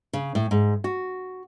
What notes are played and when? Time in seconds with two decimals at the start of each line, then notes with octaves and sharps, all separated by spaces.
0.13 C#3
0.35 A2
0.51 G#2
0.84 F#4